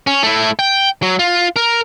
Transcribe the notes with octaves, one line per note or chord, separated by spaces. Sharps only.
C#4
A3 E4
G5
F#3
F4
A#4